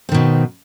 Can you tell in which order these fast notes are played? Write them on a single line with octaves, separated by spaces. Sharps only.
C4 D#3 B2